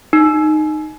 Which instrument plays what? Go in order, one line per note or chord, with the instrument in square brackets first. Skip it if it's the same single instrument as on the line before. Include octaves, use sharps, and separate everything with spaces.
[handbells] D#4